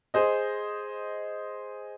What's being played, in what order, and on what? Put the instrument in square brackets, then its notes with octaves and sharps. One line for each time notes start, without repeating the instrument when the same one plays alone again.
[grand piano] G#4 C5 D#5